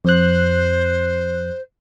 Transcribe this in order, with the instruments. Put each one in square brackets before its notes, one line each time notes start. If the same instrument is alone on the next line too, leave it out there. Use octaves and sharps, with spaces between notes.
[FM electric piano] F2 F#6 [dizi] C5